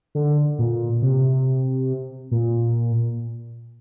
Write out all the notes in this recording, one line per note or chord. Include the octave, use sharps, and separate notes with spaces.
D3
A#2
C3
A#2